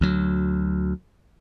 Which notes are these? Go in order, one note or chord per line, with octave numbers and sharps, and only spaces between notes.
D2 F#3